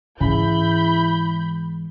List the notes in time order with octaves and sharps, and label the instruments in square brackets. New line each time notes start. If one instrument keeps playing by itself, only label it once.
[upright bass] G#2 E3 [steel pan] C#3 [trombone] E4 [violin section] B5 G6